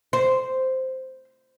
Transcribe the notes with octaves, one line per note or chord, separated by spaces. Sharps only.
C5